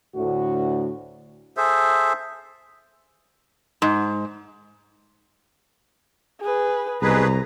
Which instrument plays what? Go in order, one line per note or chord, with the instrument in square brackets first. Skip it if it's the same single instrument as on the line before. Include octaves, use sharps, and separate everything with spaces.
[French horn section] D2 A2 F#4
[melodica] G#4 A4 C5 E5
[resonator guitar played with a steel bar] G#2
[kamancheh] G#4 B4
[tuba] C2 [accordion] B2 G#4 B4 [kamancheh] A#5